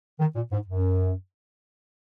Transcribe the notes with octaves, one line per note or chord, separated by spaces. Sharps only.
D#3
A#2
G#2
F#2